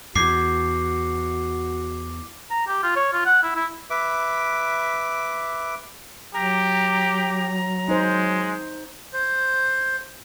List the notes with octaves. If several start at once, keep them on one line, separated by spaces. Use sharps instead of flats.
E2 F#4 D6 C7
A#5
G4
F4
C#5
F4
F#5
E4
E4
B4 E5 D6
F#3 G4 A#5
G#3 D#4 C5
C5